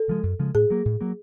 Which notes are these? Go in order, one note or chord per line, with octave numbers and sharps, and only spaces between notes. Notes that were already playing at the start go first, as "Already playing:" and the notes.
Already playing: A4
C#3 F3 G#3
F#2
C#3 F3 G#3
A2 G#4
F#3 A#3
A2
F#3 A#3